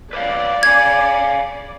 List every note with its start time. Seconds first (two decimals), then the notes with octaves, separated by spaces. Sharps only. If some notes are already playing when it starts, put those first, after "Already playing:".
0.13 B4 C#5 D5 F5
0.63 C#5 F5 G#5 G#6